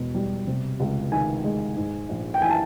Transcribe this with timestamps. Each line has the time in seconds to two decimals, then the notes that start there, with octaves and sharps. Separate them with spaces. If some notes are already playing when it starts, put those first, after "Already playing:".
Already playing: E1 B2
0.14 G3
0.47 C3
0.80 C#2
1.12 D#3 G#5
1.44 G#3
1.76 G#2
2.09 A#1
2.34 G5
2.41 E3 G#5
2.49 A5